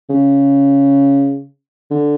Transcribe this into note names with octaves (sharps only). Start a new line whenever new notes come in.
C#3
D3